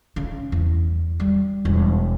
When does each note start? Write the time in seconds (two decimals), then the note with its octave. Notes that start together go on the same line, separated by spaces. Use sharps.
0.16 C#3
0.52 E2
1.20 G3
1.65 E1